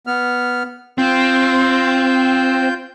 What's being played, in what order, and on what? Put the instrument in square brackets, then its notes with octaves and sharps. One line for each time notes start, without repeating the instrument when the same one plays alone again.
[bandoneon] B3 F6
[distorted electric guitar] C4 [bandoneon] F4 G6